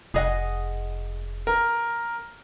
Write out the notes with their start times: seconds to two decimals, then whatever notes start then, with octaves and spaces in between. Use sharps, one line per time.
0.14 F1 G#4 D#5 F#5
1.47 A#4